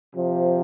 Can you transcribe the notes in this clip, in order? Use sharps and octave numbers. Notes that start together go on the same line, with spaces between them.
C3 F3